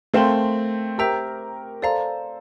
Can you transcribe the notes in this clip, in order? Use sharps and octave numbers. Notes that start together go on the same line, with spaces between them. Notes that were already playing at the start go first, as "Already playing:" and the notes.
A3 C4 A#4 F5 A5 C6
G4 A#4 C5 E5 G5 A#5 E6
A4 C5 D5 F5 A#5